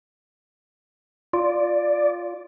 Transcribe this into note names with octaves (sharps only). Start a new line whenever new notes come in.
F4 D5